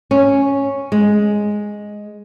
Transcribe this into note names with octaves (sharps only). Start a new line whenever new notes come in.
C#4
G#3